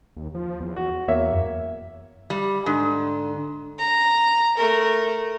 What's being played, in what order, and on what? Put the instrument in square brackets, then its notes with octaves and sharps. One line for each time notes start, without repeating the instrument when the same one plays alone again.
[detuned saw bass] D#2
F3
E2
[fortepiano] F#4
[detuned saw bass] E2 [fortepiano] A#3 C#5 E5
[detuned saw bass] F#2
[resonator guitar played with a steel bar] G3
[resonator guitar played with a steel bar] G#2 [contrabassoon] D3
[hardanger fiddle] A#5
A3 A#4